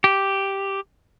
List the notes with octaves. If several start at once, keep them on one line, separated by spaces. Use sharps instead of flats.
G4